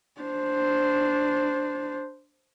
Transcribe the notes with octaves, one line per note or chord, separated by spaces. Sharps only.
D4 C5